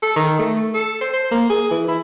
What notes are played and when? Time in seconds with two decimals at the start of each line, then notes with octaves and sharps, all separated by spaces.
0.03 A4
0.16 D#3
0.39 A3
0.74 A4
1.01 C5
1.13 C5
1.31 A#3
1.50 G#4
1.71 E3
1.88 E4